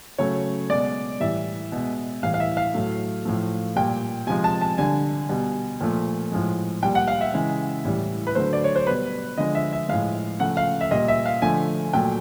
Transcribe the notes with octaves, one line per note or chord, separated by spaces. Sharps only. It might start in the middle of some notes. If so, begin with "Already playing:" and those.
C#3 F#3 A3 C#5
B2 G#3 D5
A2 E3 G3 E5
B2 G#3
A2 E3 G3 F5
F5
E5
F5
A2 F#3 A3
A2 F3 A3
A#2 G3 G5
C3 F3 G#3 G#5
A5
A5
D3 G3 G#5
B2 G3
A#2 F3 A3
A2 F3 G#3
A#2 G3 G5
F#5
F5
E5
C#3 E3 G#3
A2 E3 G3
B4
D3 F#3 A3 C5
D5
C#5
C5
B2 G3 B4
D3 F3 G#3 D#5
E5
E5
A2 F3 G#3 F5
C#3 F3 A3 F#5
F5
E5
A#2 G3 D#5
E5
F5
D3 F3 A3 G#5
A#2 F#3 A3 G5